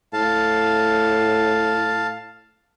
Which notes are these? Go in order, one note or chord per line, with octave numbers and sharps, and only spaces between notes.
A2 F5 A5